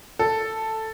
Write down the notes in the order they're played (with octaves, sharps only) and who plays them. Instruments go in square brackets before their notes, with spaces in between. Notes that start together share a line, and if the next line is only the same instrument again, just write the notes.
[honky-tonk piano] A4